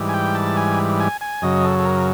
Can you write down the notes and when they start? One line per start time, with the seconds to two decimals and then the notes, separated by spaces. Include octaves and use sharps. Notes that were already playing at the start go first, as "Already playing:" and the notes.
Already playing: G#2 E3 G3
0.09 G#5
0.14 G5
0.35 A5
0.56 G#5
1.00 G#5
1.21 G#5
1.42 F#2 C#3 F#3 D#5
1.64 A4
1.79 A4
1.85 A#4